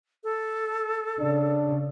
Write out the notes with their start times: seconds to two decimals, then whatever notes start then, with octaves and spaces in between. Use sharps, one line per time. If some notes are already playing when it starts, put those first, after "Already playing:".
0.24 A4
1.20 C#3 D4